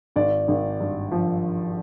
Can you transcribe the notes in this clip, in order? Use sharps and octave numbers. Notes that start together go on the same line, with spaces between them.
G#1 D5
G#1
G2
F3